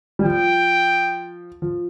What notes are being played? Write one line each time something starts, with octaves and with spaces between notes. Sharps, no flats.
G3
F3 G5
F3